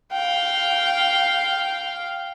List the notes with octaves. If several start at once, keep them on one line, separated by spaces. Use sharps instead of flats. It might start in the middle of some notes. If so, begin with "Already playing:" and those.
F5 G5